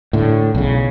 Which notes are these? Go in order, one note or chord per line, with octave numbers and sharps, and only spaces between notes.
A2 D3
B1 C#3